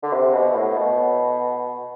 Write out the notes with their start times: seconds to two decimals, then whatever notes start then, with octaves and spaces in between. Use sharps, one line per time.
0.03 D3
0.13 C3
0.34 B2
0.55 A2
0.77 B2